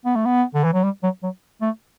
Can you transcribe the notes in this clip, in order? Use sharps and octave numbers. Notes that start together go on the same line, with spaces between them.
B3
A3
B3
D3
E3
F#3
G3
F#3
F#3
A3